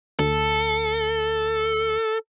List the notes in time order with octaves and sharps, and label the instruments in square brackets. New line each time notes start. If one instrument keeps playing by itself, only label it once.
[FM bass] D2 [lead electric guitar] A4